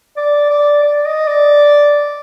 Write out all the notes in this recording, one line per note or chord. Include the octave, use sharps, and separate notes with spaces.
D5
D5
D5
D#5
D5